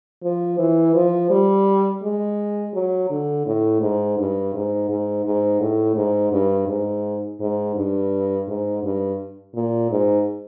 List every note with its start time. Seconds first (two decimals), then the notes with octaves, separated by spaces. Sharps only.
0.24 F3
0.59 E3
0.95 F3
1.30 G3
2.03 G#3
2.74 F#3
3.10 D3
3.46 A2
3.82 G#2
4.18 G2
4.54 G#2
4.89 G#2
5.25 G#2
5.61 A2
5.96 G#2
6.32 G2
6.68 G#2
7.40 G#2
7.76 G2
8.48 G#2
8.83 G2
9.55 A#2
9.91 G#2